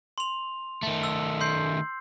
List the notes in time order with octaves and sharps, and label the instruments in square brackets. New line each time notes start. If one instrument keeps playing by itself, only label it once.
[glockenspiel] C6 F7
[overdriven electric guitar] D#3 A3
[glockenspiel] E6
C6 G6 C7